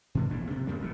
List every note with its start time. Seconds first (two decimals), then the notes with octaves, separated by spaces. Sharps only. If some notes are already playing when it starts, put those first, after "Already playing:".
0.15 B2 D3 G#3
0.29 A#1 E2 A2 D4
0.51 C3
0.67 E2 C#3 G3 A#3
0.80 E1 C2 B2